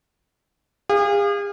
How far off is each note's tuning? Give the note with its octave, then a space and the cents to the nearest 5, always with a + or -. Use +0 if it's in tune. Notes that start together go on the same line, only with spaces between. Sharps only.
G#4 -40 F5 +0